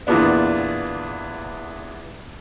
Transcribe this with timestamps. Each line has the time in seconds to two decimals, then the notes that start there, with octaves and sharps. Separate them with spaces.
0.07 E2 A#2 D3 B3 D4